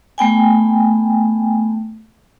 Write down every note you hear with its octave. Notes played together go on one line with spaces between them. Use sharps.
A3 B3 G5 G#5